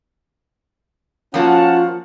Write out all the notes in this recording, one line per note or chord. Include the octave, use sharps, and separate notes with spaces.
F3 A#3 C#4 F4 F#4 F#5 A5